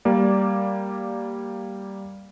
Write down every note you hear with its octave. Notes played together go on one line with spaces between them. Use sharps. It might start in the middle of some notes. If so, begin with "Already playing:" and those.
G3 A#3 D5